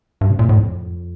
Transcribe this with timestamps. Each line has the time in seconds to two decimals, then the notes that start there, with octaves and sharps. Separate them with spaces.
0.21 G2
0.30 C3
0.39 A#2
0.49 A2
0.57 F2